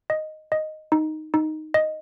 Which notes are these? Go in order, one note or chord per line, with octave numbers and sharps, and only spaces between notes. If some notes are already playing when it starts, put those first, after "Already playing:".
D#5
D#5
D#4
D#4
D#5